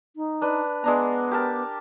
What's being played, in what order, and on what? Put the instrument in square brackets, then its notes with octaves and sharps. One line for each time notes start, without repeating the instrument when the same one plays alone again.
[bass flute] D#4
[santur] D4 B4
[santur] G#3 D4 A#5 [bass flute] B3
[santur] G4 A#4 A5